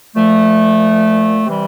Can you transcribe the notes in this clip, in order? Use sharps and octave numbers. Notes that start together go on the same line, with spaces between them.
A#2 F3 A3
C3 E3 G3